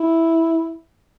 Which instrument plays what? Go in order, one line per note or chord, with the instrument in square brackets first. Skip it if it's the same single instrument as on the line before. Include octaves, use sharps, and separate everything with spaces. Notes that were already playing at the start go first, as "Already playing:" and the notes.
Already playing: [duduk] E4